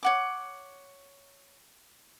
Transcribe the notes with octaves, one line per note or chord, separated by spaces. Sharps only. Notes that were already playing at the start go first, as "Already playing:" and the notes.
C#5 F#5 D6